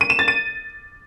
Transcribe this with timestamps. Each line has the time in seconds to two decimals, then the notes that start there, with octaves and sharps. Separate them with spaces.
0.01 D#7
0.10 E7
0.19 A6
0.28 D#7